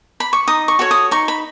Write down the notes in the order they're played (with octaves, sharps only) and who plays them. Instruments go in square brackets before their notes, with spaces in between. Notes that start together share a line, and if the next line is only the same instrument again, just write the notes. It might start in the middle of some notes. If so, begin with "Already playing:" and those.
[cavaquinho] B5
C#6
D#4 D#6
C#6
F#4 A4 C#5
D#6
D#4 C#6
B5